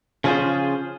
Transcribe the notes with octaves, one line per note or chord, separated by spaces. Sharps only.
C#3 F3 C#4 F4 G#4 C5